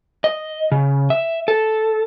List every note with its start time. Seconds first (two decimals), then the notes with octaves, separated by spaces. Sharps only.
0.24 D#5
0.72 C#3
1.10 E5
1.48 A4